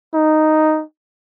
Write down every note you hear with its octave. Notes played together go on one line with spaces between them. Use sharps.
D#4